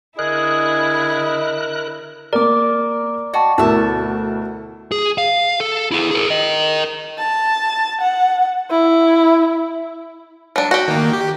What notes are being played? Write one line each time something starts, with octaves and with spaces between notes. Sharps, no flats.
D3 E4 G#4 A#4 D#5 F#6
A#3 A#4 D5 D6
F#4 D#5 G5 A5
D2 B2 E4 A#4 E5 A5
G#4
F5
A4
E4 G#4
G#4 A#4
A#4 D#5
A5
F#5
E4
F#3 D4
F#4 G4
D#3 A#3
G4